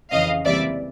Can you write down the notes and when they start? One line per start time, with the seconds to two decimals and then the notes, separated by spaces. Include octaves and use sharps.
0.11 F2 C#3 E3 D#5 F5
0.45 C#2 C3 E3 G3 A#3 D5 E5